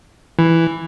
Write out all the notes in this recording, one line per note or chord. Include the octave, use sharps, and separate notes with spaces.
E3